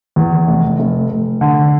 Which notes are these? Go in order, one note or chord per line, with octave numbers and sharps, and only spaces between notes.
E2
F1
F1
F1
D3